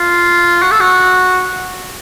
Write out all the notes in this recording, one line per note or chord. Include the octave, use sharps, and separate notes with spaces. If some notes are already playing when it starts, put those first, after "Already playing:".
Already playing: F4
F#4
A4
F#4